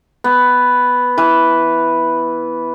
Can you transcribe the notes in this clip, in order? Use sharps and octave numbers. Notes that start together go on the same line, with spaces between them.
B3
E3 B4